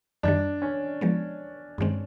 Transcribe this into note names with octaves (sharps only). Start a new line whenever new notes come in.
F#2 D#3 G3 D4
C#4
F3 G#3 B3
G2 D#3 G#3 C4